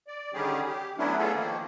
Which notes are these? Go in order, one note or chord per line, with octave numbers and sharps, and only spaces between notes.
D5
D3 D#3 G3 C#4 G4 G#4
G4
F#3 A3 B3 C#4 D4 E4
A3 B3 C#4 F4 G#4 A4
D#3 F3 A#3